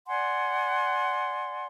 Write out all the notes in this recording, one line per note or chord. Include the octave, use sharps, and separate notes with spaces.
D5 F#5 G#5 C6